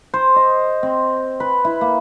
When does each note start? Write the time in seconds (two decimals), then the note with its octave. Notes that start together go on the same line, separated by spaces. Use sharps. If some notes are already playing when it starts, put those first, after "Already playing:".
0.14 C5
0.36 D#5
0.83 C4
1.40 B4
1.65 E4
1.81 A#3